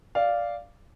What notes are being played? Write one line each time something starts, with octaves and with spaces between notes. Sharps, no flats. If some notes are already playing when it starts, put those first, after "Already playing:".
D5 F5